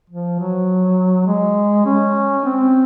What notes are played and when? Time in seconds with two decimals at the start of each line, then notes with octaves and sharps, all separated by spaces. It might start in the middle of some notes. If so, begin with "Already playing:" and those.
0.10 F3
0.39 F#3
1.27 G#3
1.85 C#4
2.45 C4